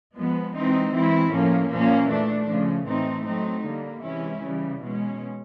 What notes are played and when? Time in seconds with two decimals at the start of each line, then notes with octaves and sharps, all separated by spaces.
0.15 F3 G#3 B3
0.54 E3 G#3 C4 D#4
0.93 E3 G#3 C4 E4
1.31 A2 F3 A#3 C#4
1.70 A#2 F3 A#3 C#4
2.09 E3 A3 D4
2.49 C#3 F3 A3
2.87 A2 E3 A3 C4 D#4
3.26 F#3 A3 C4 D#4
3.65 D3 G3 A#3
4.04 C3 E3 G#3 C#4 E4
4.43 C#3 E3 G3
4.82 B2 G#3 C#4